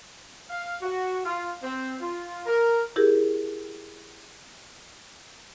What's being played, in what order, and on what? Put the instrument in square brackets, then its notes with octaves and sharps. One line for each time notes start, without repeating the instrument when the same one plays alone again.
[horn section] F5
F#4
F4
C4
F4
A#4
[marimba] E4 G4 G#4 A#4